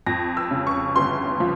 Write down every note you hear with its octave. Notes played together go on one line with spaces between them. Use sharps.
F2 A#6
E6
C#3
C#6
G1 C6
F3